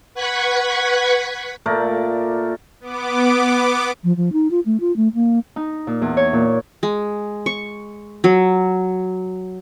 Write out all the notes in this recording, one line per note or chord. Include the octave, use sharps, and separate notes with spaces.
B4 F#5 C#6 F#6 G#6 B6
A#2 A3 A#4 D5
B3 D6
F3
F3
D#4
F4
A3
F4
A3
A#3
D#4
A#2
E2
C#5
A#2
G#3
C#6
F#3